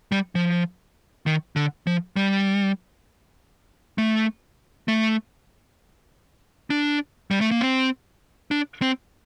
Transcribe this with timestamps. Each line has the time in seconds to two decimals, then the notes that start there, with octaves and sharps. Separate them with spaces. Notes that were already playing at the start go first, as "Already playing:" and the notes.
0.12 G3
0.35 F3
1.26 D#3
1.56 D3
1.87 F3
2.16 G3
3.98 A3
4.88 A3
6.70 D4
7.31 G3
7.41 A3
7.51 A#3
7.61 C4
8.51 D4
8.82 C4